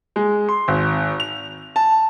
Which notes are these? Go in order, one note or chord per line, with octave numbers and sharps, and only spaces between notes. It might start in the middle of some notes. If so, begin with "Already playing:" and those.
G#3
C6
G#1
F7
A5